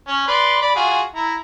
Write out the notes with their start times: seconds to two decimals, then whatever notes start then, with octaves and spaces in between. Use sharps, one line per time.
0.07 C#4
0.28 B4 D5 C6
0.62 D5 B5
0.76 F4 F#4 G#4
1.15 E4 A#5